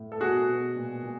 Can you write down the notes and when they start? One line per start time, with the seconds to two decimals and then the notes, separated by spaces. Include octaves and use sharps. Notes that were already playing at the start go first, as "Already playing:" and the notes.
Already playing: A2
0.12 A4
0.20 B2 F#4 G#4
0.49 B2
0.76 A#2
1.03 A#2